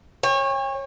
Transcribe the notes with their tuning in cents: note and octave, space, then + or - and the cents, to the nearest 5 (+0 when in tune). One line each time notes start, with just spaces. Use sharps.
C#5 -20 G5 +45